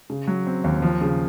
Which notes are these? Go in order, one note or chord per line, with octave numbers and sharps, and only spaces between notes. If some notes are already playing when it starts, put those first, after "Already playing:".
C#3
F#3
C4
D#2
F3
C#3